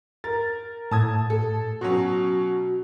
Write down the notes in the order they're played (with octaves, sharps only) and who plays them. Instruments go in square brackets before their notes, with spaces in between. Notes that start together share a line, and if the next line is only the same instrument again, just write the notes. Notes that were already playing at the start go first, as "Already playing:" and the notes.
[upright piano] A#4 A6
[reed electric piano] A2 [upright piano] A5 D#6 G#6
[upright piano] A4
[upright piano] B2 F#3 C#4 [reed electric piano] F#4